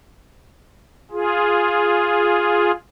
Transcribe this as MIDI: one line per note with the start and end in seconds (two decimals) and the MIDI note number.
1.11 2.71 65
1.11 2.71 68